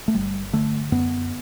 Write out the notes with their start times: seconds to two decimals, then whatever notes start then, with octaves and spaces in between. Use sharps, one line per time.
0.08 A3
0.14 G1 G3
0.53 D3 A3
0.92 F#2 B3